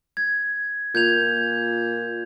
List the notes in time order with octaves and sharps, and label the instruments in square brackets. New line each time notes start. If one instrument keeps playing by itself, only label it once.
[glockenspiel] G#6
[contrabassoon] A#2 [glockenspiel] G6 G#6 F7